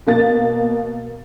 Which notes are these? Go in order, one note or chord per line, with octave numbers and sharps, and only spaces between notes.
B2 A#3 A6